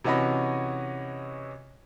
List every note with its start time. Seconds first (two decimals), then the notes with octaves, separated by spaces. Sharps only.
0.04 C3 E3 C#4 F#4 D#5 B5